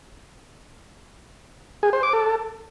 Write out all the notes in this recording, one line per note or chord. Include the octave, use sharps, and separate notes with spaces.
G#4
C5
D6
A4